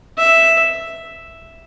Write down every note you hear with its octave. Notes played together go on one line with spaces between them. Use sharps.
E5